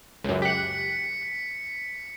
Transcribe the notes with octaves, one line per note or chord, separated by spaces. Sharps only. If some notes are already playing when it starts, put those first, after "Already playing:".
C#2 F#2
G4 F#6 B6 C#7